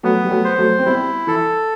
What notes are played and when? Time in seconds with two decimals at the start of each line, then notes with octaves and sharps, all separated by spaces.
0.03 F#3 A3 B3
0.24 G3
0.31 F#3 A3
0.45 C5
0.58 F#3 A3
0.79 C4
0.85 G3 B3 E4
1.27 E3 A4